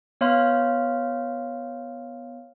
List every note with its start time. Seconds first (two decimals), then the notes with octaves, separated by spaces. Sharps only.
0.21 B3 C#5 F5 C6 F6